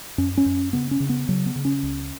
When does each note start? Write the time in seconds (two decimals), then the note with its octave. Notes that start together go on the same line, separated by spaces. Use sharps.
0.18 F#2 C#4
0.37 C#4
0.46 F#2
0.73 C#3 B3
0.91 C#4
1.00 C#3
1.09 B3
1.29 C#3 F#3
1.46 B3
1.56 C#3
1.65 C#4
1.83 C#2